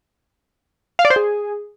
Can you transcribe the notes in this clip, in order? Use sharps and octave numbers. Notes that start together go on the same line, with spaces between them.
F5
D5
C5
G#4